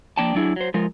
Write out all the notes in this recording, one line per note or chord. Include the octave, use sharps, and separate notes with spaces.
F3 A#3 D4 G5 A5
F#3 D4 E4 G#4
F#3 C5
F3 G#3 F4 A#4